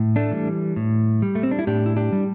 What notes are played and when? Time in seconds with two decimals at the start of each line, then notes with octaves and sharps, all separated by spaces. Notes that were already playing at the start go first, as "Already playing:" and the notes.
Already playing: A2
0.16 A3 D4
0.31 E3 G3
0.76 A2
1.22 G3
1.35 A3
1.43 C4
1.51 D4
1.59 E4
1.67 A2 D4 G4
1.86 E4
1.96 D4 G4
2.13 G3